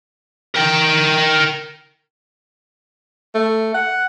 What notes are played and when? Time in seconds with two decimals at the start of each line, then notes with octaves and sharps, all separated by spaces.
0.56 A#4 G5
3.35 A3
3.74 F#5